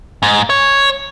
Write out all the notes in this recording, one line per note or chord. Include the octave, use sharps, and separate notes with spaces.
G#2
C#5